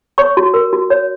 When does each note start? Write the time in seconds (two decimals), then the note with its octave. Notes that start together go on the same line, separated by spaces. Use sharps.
0.18 C#5 C#6
0.37 F#4
0.54 A#4
0.73 F#4
0.90 C#5